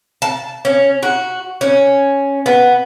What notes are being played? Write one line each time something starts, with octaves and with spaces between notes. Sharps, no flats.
A5
C#4
F#4
C#4
B3